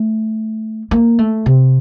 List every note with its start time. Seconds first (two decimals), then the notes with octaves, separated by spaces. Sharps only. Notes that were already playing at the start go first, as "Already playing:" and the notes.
Already playing: A3
0.91 A#3
1.19 A3
1.46 C3